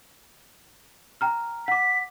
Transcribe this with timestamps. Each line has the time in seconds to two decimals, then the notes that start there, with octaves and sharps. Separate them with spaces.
1.21 G5 A#5 F6
1.68 F#5 D6 B6